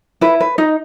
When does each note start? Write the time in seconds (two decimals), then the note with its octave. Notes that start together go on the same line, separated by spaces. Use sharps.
0.21 E4 B4
0.40 B4
0.58 D#4 D#5